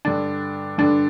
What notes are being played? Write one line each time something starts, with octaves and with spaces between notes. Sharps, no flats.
G2 D3 D4
G2 D3 D4